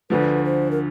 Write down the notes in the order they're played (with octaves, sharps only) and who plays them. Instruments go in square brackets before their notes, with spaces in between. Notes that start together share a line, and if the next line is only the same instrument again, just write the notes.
[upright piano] D2 D3 F3 [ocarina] B4
[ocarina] C5
A#4